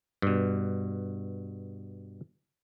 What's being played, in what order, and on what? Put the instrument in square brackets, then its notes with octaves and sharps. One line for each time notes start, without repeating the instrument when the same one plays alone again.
[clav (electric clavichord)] G2 B2